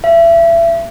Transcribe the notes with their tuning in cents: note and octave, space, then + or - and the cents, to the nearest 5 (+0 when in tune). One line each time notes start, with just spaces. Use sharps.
E5 +30